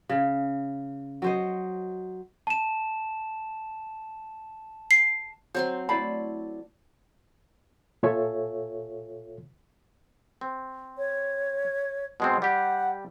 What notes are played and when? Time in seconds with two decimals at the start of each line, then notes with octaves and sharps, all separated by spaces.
0.09 C#3
1.22 F#3 C5 D#5
2.47 A5 E7
4.91 C7
5.55 F#3 C4 C5 C6
5.89 A3 E4 D5 B5 C7
8.03 A#2 F4 A4 C#5 E5 G#5
10.41 C4
10.98 C#5
12.20 B2 G#3 C4
12.42 G3 G4 F#5